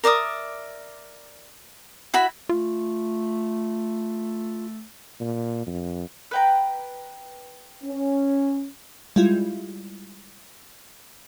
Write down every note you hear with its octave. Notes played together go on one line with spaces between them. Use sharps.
A#4 D5 E5 D#6
E4 F#4 B5
A3 F4
A#2
F2
B4 G5 A#5
C#4
G3 G#3 E4 F4